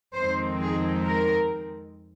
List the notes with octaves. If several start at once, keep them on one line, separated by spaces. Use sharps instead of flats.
F2 D#3 G#3 C4 D#4 C5
G#4
A#4